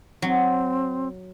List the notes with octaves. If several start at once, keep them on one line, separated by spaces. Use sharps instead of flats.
F#3 C4